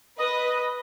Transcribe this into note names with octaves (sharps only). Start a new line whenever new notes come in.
B4 D#5